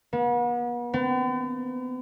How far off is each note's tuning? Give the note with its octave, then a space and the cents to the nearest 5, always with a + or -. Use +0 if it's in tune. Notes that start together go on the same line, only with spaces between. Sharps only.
B3 -40
B3 +45